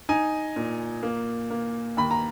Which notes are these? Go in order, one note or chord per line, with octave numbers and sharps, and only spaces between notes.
D#4 G#5
A#2
A#3
A#3
D#2 B5
A#5